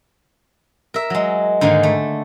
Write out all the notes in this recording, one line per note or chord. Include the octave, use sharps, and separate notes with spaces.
A#4 E5
F#3 G#3
G#2 D3 D#3 A#3
A3